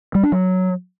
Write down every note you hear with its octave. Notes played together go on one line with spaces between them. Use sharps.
G3
D4
F#3